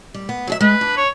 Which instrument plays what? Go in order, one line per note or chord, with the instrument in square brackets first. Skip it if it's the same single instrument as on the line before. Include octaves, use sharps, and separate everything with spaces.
[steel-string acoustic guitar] G3
B3
F#3 G#4 E5
[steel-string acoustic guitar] G#3 [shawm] B4
[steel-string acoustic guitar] D4
[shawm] C#5